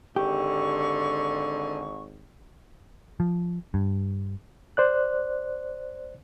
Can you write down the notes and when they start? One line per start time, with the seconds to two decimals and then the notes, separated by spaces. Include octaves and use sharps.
0.16 G#1 D3 G4 C#6
3.20 F3
3.74 G2
4.77 C5 D5 F#6